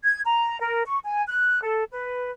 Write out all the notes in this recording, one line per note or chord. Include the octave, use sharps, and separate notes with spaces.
G#6
A#5
A#4
C#6
G#5
F#6
A4
B4